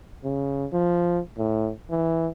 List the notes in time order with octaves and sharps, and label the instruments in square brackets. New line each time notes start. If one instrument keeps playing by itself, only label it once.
[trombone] C#3
F3
A2
E3